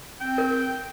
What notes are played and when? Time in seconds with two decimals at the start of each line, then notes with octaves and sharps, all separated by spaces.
0.21 C4 G5
0.38 A#4